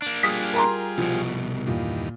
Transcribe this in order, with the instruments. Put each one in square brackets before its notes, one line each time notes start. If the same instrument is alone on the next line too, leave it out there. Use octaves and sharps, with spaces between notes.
[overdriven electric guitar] A#3 D4
[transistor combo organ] G3 F4 G#4 [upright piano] D#6 B6
[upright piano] A#4 A#5 C6
[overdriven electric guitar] C2 B2 [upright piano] F3
[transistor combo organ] E2 G2 D#3 [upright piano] A#2